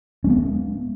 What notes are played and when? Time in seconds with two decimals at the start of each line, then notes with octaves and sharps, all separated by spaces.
0.24 C#4
0.27 G#3
0.30 B3